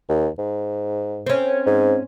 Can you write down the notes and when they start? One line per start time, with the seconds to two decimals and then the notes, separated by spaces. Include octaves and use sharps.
0.09 D#2
0.38 G#2
1.26 C4 C#4
1.66 G#2